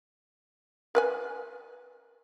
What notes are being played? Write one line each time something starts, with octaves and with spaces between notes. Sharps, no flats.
A#4 B4 G#5